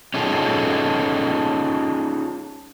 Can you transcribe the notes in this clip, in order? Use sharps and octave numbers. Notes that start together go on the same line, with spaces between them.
C#4 D#4 F4 G#4 A4